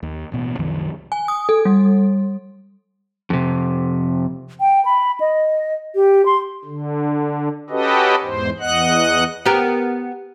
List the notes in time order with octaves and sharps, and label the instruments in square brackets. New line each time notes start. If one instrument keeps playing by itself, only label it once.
[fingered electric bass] D#2
A1 B2
C2 F#2 D#3 F3
[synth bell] G#5
D#6
A4
G3
[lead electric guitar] F2 C3
[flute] G5
B5
D#5
G4
C6
[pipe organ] D3
C#4 F#4 G4 A4 B4 D#5
E2 G#2 C5
E2 D#5 F#5 F#6
[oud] B3 G4 A#4